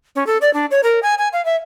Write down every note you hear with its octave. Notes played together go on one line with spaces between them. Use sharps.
C#4
A4
D5
D4
C#5
A#4
G#5
G#5
F5
E5